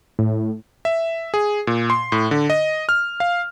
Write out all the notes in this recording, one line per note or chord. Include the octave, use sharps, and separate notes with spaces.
A2
E5
G#4
A#2
C6
A2
D3
D#5
F6
F5